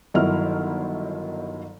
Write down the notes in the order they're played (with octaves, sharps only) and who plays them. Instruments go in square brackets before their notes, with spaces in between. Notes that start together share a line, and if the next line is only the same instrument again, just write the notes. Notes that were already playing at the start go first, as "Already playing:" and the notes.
[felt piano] G1 D#3 F#3 E4 F6